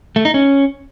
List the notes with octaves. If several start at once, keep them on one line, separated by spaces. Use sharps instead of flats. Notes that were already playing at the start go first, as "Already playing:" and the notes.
A3
D#4
C#4